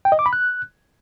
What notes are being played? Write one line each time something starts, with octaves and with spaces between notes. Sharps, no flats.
G5
D#5
D6
B5
F#6